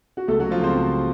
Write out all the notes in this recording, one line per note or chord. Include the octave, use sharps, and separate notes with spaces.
F#4
C#2 A3 A4
F#3 F#4
C#2
F3 F4
C#2 C4 C5
C#2